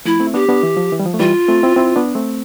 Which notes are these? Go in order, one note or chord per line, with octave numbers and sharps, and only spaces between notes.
F3 A3 E4
A3 C4
E4
B3 D4 G4
B3 D4
E3
F3
E3
G3
F3
A3
E3 G3 F4
A3 C4
C4 E4
C4 E4
B3 D4
A3 C4